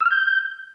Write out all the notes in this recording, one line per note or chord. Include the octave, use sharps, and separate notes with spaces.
E6
F6
G6